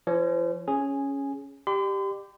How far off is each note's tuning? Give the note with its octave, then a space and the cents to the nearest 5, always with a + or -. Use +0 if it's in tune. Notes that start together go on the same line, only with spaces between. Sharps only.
F3 -40 C#5 +0
C#4 +0 G#4 +0 G#5 -5
G4 +0 D5 +40 C6 -45